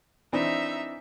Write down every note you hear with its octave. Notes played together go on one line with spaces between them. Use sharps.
E3 C4 D4 D#4 E5